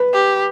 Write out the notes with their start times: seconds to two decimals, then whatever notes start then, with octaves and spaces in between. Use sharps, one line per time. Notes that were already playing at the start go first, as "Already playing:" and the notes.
Already playing: B4
0.14 G4